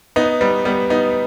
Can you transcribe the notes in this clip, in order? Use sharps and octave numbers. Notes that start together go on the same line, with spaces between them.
B3 D#4
G3 B3
G3 B3
B3 D#4